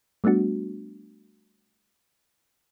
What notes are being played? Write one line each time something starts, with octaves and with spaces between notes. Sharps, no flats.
G3 A3 B3 D4 F#4